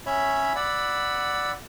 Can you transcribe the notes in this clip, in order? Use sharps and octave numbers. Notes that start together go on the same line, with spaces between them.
C#4 C#5 E5 B5
D5 F#5 B5 E6